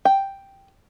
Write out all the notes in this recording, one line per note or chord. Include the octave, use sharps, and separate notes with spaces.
G5